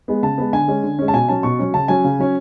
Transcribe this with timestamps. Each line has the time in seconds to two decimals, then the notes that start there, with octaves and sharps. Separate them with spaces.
0.08 G#3 B3
0.23 C#3 A5
0.38 G#3 B3
0.53 D3 G#5
0.68 G#3 C#4
0.83 D3
0.99 G#3 C#4
1.08 A5
1.13 B2 G#5
1.29 F#3 C#4 A5
1.43 B2 C#6
1.59 F#3 C#4
1.73 C#3 A5
1.88 F#3 C#4 G#5
2.04 C#3
2.19 F#3 C#4